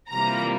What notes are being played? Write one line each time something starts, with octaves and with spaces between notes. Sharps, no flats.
C3 E3 G3 A#3 F4 A#5